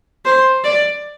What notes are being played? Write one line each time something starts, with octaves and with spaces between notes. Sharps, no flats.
C5
D5